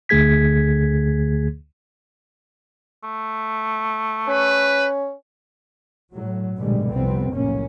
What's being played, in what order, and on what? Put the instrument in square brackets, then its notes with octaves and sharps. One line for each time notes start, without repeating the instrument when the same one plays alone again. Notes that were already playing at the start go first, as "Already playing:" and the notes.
[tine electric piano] D2 D3 A3 G#4 G#6 B6
[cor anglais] A3
[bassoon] C#4 [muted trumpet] B4
[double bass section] A2 F#3
A#1 G#2 B2 D3 G3 G#3
C2 F2 C3 B3 C4
F1 B1 A2 A#3 C#4